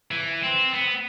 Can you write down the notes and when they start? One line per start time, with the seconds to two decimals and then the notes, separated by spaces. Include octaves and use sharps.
0.11 E3
0.43 C4
0.74 B3